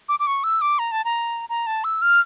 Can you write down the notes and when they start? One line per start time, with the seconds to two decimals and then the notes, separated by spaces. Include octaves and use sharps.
0.09 D6
0.20 D6
0.27 C#6
0.44 E6
0.61 D6
0.79 A#5
0.92 A5
1.05 A#5
1.49 A#5
1.67 A5
1.84 E6
2.02 F6